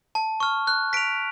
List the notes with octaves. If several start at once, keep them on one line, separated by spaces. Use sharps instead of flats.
A5
C#6 F6
F#6
B6 D7 F7